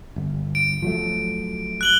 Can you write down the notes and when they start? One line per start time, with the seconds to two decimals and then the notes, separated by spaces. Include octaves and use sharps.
0.16 G1
0.55 D7
0.82 F3 F#3 A3
1.81 F#6 F#7 G7